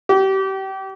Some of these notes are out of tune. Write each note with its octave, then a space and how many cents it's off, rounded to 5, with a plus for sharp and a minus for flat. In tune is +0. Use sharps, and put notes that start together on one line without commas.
G4 -30